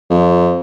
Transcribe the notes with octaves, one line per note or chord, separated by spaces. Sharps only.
F2